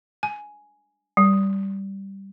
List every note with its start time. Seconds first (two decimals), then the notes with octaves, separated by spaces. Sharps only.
0.23 G#5
1.17 G3